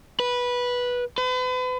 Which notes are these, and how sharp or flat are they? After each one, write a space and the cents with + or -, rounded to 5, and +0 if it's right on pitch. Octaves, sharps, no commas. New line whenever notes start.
B4 -10
B4 +40